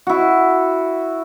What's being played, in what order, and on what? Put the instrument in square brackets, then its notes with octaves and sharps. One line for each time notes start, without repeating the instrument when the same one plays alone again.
[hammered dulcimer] E4 F#4